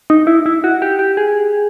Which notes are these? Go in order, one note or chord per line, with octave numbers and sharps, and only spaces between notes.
D#4
E4
E4
F#4
G4
G4
G#4